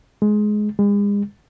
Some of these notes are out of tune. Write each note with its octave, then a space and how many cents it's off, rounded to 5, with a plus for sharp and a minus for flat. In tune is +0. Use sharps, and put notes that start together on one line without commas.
G#3 +15
G#3 -40